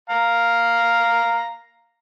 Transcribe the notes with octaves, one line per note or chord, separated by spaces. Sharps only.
F5 A#5